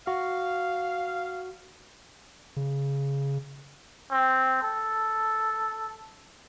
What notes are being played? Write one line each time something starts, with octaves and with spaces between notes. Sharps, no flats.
F#4 F5
C#3
C4
A4